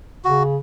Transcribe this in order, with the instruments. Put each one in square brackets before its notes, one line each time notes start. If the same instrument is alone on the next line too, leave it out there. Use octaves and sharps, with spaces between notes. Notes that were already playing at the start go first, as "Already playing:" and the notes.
[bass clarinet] C#3 [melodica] F#4